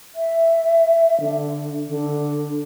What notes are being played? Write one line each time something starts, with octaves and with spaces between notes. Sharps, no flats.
E5
D3
D3